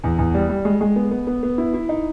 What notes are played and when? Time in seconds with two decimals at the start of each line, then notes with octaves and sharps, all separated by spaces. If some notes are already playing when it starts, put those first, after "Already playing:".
0.04 E2
0.18 E2
0.34 G3
0.49 G3
0.65 G#3
0.81 G#3
0.96 B3
1.11 B3
1.27 B3
1.43 B3
1.58 E4
1.74 E4
1.89 D#4